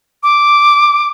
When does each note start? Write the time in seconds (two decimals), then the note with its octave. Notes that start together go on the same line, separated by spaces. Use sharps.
0.23 D6